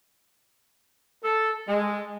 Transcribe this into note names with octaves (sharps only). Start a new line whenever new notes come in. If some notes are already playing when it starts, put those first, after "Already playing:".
A4
G#3